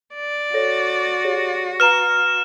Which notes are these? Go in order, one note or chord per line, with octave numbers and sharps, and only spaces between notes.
D5
F#4 A4 C#5 A#6
G4 G#4 C#5
B4 A#5 F6 E7